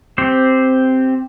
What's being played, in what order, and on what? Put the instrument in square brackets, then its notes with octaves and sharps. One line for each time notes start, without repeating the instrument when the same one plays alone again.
[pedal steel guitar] C4 G4 C5